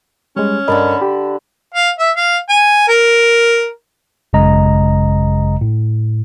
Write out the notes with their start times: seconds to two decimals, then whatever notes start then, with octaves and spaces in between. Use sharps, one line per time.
0.36 G3 G#3 C#4
0.68 G2 D3 A#4 D#5 A5 B5
1.02 G4
1.74 F5
1.99 E5
2.16 F5
2.49 G#5
2.88 A#4
4.33 G#1 F#2 C#3 G#3 D#5 A#5
5.61 A2